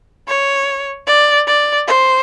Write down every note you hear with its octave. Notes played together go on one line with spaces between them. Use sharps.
C#5
D5
D5
C5